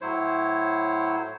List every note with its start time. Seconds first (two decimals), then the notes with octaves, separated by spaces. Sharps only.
0.01 A2 F#3 E4 C5 C#5